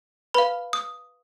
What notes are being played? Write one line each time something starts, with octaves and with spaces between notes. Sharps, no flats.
B4 F5 B5
D#6